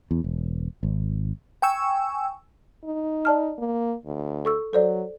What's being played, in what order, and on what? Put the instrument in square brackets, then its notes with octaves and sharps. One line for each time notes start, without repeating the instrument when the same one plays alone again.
[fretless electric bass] E2
E1
G#1
[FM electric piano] G5 G#5 C#6 E6
[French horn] D#4
[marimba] D5 A5 F6
[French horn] A#3
D2
[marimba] A4 C#6 E6
[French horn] F#3 [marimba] A4 C5 D5